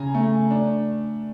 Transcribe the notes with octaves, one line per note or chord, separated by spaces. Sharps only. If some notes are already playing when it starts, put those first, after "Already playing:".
Already playing: C#3 G#5 A#5
A3
D4